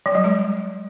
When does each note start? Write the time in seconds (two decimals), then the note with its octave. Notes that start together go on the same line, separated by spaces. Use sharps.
0.06 F#3
0.15 G3
0.24 G#3